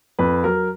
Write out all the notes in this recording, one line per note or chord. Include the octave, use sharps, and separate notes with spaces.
F2 B4
F#3 A#4